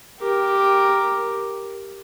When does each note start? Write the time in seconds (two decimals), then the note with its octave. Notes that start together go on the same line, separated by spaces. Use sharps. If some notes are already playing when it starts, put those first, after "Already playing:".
0.20 G4 A#4